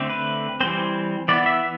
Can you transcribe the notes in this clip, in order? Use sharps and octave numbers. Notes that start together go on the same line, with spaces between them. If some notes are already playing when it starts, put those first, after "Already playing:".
Already playing: D3 A3 C4
B4
E3 G3 C4 C5
E3 B3 D5
E5